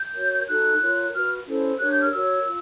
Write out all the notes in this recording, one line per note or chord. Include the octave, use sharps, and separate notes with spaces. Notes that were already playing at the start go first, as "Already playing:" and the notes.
Already playing: G6
F#4 A#4 C#5
D#4 F#4 A4 F#6
F4 A#4 C#5
F#4 B4 F6
C#4 E4 A4 C5
D4 G4 A#4 C#5 F#6
G6
F6
F#4 A#4 C#5 E6
F4